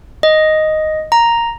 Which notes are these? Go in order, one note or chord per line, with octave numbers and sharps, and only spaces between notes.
D#5
A#5